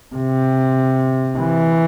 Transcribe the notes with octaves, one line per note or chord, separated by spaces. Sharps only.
C3
E3